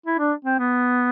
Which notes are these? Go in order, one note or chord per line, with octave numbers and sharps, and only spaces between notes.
E4
D4
C4
B3